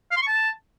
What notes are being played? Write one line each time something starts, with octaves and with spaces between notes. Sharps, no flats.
F5
C6
C#6
A5